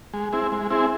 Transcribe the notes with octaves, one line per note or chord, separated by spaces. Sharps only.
G#3
C4 E4 G#4
G#3
C4 E4 G#4